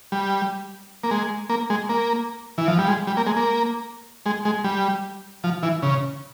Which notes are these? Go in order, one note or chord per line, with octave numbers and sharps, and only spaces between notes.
G3
A#3
G#3
A#3
G#3
A#3
E3
F3
G3
G#3
G3
A#3
G#3
A#3
G#3
G#3
G3
F3
E3
C#3